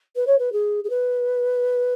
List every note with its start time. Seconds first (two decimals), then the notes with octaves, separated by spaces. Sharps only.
0.16 B4
0.27 C#5
0.39 B4
0.53 G#4
0.84 G#4
0.90 B4